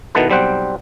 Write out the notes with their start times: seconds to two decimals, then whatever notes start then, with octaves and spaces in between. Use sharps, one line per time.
0.15 B2 D#3 B3 E4 A4 B4
0.30 B1 G3 C4 C5 F#5 G5